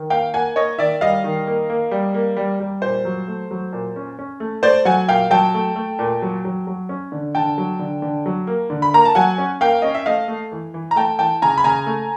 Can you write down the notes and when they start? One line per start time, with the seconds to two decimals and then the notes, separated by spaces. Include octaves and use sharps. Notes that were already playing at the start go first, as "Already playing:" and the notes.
Already playing: D#3
0.10 A#3 F5 G5
0.34 A#3 F#5 G#5
0.56 A#3 C#5 D#5
0.78 D#3 D5 E5
1.01 G3 D#5 F5
1.24 D#3
1.47 A#3
1.70 A#3
1.91 G3
2.14 A#3
2.37 G3
2.60 G3
2.82 A#2 C5
3.05 F#3
3.28 A3
3.51 F#3
3.73 A#2
3.96 C#4
4.19 C#4
4.40 A3
4.63 A3 C5 D5
4.85 F#3 F#5 G#5
5.08 A#2 F5 G5
5.31 F#3 G5 A5
5.54 A3
5.76 A3
5.99 A#2
6.22 F#3
6.45 F#3
6.67 F#3
6.89 C#4
7.12 D3
7.35 D3 G5 A5
7.58 F#3
7.79 D3
8.02 D3
8.26 F#3
8.47 A#3
8.70 D3
8.82 B5
8.94 A#3 A#5
9.05 A5
9.15 F#3 F#5 G#5
9.38 C#4
9.61 A#3 F5 G5
9.82 C#4 D#5
9.94 E5
10.06 A3 D#5 F5
10.28 A3
10.52 E3
10.74 E3
10.91 A#5
10.96 A3 G5 A5
11.19 E3 G5 A5
11.42 C#3 G#5 A#5
11.57 B5
11.64 C#3 G#5 A#5
11.86 A3